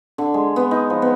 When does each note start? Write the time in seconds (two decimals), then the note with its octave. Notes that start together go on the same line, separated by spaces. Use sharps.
0.18 D3
0.34 G#3
0.56 B3
0.71 D#4
0.90 F3
1.02 B3